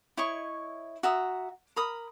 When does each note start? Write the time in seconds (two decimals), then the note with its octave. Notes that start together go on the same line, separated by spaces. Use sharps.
0.17 E4 C#5 D#5 C#6
1.03 F#4 E5 A#5 D#6
1.76 A#4 B5 D#6